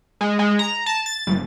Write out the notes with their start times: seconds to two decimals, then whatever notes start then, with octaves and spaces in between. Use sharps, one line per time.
0.21 G#3
0.39 G#3
0.59 A#5
0.86 A5
1.06 A6
1.27 G1